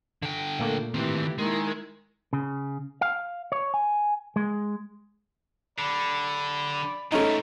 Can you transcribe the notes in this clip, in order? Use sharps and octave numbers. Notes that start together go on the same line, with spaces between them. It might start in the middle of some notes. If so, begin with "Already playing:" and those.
D3 G5
A#2 A3 A#3
D#3 E3 C4 G4
D#3 G#3 E4
C#3
F5
C#5
G#5
G#3
D3 D5 B5
A#2 E3 A3 C#4 D#4